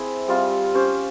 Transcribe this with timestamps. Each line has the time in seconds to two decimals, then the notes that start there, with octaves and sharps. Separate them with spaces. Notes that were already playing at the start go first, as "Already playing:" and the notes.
Already playing: C4 E4 G#4 E5
0.28 G3 C4 F4
0.74 C#4 G4 C5